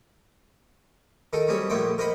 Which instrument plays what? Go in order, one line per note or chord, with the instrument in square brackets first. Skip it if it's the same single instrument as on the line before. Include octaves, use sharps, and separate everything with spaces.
[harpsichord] D#3 A4 A#4
F#3 G3 C4 C#4 G#4
A#1 A3 A#3 E4 C5 G5
A#4 C5 D#5 F#5 B5